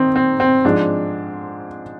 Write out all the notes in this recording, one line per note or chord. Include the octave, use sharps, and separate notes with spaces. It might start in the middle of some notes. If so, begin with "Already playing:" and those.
Already playing: D#3 C4 D#4
C4
C4
G#2 F3 G#3 D4